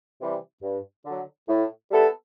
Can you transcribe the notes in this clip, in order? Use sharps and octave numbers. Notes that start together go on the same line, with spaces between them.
C3 E3 G3
G2
D3 F#3
A2
G3 B3 E4 A4